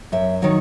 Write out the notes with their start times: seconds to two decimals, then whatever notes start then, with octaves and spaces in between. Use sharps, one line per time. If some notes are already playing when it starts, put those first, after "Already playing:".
0.12 F#2 E5
0.42 D#3 F#3 C#5